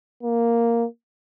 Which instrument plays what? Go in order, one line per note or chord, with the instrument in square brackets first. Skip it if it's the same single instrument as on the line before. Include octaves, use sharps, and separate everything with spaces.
[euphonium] A#3